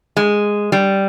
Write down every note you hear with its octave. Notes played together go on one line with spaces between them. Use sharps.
G#3
G3